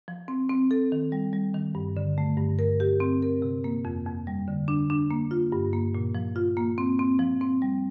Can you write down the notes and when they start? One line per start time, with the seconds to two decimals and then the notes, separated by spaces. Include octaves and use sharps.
0.08 F3
0.28 C4
0.50 C4
0.71 A4
0.92 D#3
1.12 G3
1.33 G3
1.54 D#3
1.75 G2
1.97 D3
2.18 A3
2.38 G2
2.59 A#4
2.80 G4
3.00 C4
3.22 A#4
3.42 C3
3.64 A#3
3.85 F2
4.06 F2
4.27 G3
4.48 D3
4.68 D4
4.90 D4
5.11 A#3
5.31 F4
5.52 G2
5.73 A#3
5.95 A#2
6.15 F3
6.36 F4
6.57 A#3
6.78 C4
6.99 C4
7.19 F3
7.41 C4
7.62 G3